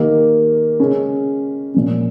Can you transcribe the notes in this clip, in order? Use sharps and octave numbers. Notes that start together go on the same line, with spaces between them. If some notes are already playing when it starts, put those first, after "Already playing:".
Already playing: D#3 A#3 D#4 G4
C#3 G#3 C#4
A#2 F3 A#3 C#4